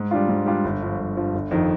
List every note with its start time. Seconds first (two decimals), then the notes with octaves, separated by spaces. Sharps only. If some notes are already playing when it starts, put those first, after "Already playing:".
Already playing: G#2
0.11 G3 D4 F4
0.29 G#2
0.46 G3 D4 F4
0.64 G1
0.81 G2 F3
0.99 G1
1.17 G2 F3
1.34 G1
1.51 F2 D#3